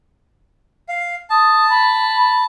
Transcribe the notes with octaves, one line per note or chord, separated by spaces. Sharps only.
F5
A5 D#6
B5